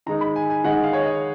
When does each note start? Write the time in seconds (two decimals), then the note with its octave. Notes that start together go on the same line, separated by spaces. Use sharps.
0.06 D#3 G#3 D#4 A#5
0.21 B5
0.36 G#5
0.50 G#5
0.64 D#3 G#3 D#4 F#5
0.84 F5
0.93 C#5
1.03 D#5